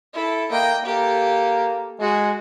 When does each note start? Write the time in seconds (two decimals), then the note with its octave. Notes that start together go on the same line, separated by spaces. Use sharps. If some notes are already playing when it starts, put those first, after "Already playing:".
0.14 E4 A4
0.51 A#3 D#5 G5
0.85 A#3 G4 A4
2.00 G#3 F#4 G#4